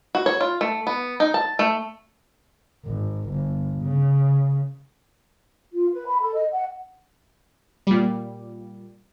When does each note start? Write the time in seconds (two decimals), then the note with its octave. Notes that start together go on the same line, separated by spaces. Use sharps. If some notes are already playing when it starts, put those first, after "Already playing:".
0.15 F#4
0.26 C#5
0.41 F4
0.61 A3
0.87 B3
1.20 D#4
1.34 A5
1.59 A3
2.85 G#1
3.29 G1
3.83 C#3
5.73 F4
5.93 B4
6.06 B5
6.20 A4
6.35 D#5
6.52 F#5
7.87 A#2 G3